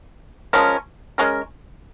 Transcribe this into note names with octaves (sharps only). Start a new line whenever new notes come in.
F3 G#3 C#4 A#4
G#3 C#4 A#4